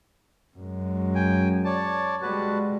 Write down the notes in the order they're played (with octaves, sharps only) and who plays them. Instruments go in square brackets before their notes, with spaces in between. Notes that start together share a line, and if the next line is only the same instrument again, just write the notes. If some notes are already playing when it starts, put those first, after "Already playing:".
[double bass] F#2 G#3
[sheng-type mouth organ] G5 G#5
C#5 D5 A5
[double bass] G3 G#3 [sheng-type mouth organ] F#4 B4 A5